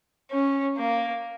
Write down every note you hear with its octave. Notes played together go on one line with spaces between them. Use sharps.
C#4
A#3